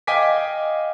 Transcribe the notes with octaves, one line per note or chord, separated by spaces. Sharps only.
D#5 F5 G5 G#5 D6 B6